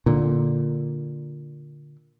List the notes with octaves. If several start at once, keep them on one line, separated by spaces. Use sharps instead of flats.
A#2 D3